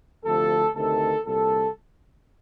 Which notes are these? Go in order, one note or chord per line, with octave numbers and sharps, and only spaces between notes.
D2 C3 F3 A4
D2 C3 D#3 A4
C2 A#2 A4